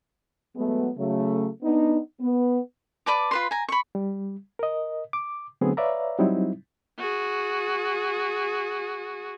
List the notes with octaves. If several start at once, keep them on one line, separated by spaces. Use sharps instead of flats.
F#3 G#3 A3 B3
C#3 F#3 A3
B3 D4 D#4
B3
B4 D5 A5 D6
F4 B4 C6
G#5 A#5
B5 C#6
G3
A#4 D#5
D6
D3 F#3 A3 B3 C4 G#4
B4 C#5 D5 E5 F5 A#5
F#3 G3 C4 D#4 E4
F#4 G#4